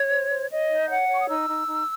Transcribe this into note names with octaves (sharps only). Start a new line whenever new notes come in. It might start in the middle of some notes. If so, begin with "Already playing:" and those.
Already playing: C#5
C5
C5
C#5 D#5
D#4
C#5 F#5
C#5
C#6
D#6
D#4 E6
D#4
D#4